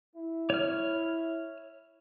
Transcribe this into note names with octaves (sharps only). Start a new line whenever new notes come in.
E4
C#5 F6